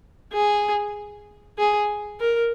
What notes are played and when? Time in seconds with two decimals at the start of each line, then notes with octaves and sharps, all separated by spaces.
0.34 G#4
1.58 G#4
2.20 A#4